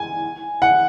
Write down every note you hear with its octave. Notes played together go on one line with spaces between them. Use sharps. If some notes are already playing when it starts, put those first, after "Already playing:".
Already playing: G#5
F#5